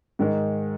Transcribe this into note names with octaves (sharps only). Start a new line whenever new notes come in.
G#2 D#3 G#3 D#4